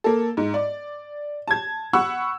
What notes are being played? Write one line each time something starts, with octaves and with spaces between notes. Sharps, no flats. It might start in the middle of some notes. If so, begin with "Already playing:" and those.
A#3 A4
G#2
D5
A5 G#6
F#5 B5 C#6 E6